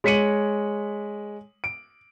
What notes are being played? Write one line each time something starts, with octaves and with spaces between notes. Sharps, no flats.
G#3 C#5 B6 C#7 D#7 F#7
D7